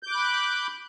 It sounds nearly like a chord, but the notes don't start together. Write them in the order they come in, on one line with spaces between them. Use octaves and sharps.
G6 D6 F#6 B5